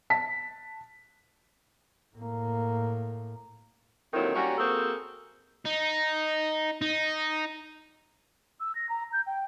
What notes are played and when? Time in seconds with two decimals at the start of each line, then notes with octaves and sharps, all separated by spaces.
0.10 A5 B6
2.16 A2 A#3
4.13 D#2 D3 D#3 F#3 C4 E4
4.35 G3 A#3 C#4 F#4
4.58 A#3 C4 F#4 G#4 A4 C5
5.66 D#4
6.82 D#4
8.60 E6
8.75 A#6
8.89 A#5
9.13 G6
9.27 G5